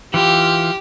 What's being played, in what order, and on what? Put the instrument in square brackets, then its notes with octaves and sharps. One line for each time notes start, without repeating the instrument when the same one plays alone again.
[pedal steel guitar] E3 F4 [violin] G4